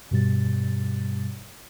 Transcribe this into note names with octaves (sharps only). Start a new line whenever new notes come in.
G2 B2 G3 A6